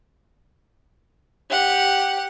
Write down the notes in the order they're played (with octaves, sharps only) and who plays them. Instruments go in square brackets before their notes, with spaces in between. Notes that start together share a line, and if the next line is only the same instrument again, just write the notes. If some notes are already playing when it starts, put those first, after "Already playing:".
[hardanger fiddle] G4 F#5